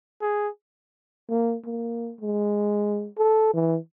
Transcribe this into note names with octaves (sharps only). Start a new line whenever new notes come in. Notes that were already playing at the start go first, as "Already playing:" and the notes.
G#4
A#3
A#3
G#3
A4
E3